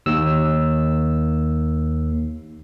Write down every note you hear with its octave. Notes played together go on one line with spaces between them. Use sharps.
D#2 E6